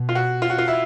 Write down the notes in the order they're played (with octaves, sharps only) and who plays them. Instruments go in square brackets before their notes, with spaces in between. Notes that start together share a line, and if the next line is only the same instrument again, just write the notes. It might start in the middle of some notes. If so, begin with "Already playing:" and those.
Already playing: [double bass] B2
[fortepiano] F4
F#4
F4
F#4
F4
E4